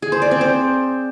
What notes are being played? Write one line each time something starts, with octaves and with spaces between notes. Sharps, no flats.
G#4
C5
D5
C4
C5